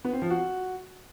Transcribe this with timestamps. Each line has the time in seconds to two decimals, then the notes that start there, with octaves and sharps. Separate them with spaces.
0.05 B3
0.13 C4
0.22 F3
0.30 F#4